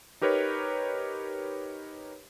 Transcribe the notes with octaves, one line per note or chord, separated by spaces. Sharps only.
D#4 G4 A#4 B4 C#5